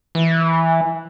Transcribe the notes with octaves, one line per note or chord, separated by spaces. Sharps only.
E3